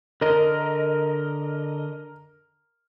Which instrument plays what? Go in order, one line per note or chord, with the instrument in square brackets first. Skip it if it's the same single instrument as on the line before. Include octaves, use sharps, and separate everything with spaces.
[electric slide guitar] D3 D#5 [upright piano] A#4